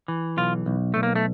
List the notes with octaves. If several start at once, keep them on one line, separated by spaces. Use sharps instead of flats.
E3
B1 F4
B1
B1 A3
A#3
A3